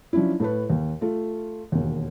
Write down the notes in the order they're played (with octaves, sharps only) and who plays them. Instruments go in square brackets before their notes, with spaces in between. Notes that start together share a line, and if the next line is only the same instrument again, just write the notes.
[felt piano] F3 F#3 C#4 D4 E4
A2 A4 B4
D#2
A3 F4
E1 D#2